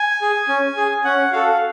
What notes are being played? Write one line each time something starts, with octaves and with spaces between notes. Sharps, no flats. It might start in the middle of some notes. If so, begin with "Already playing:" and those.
Already playing: G#5
G#4
C#4
G#4
C#4 F#5
F#4 A4 F5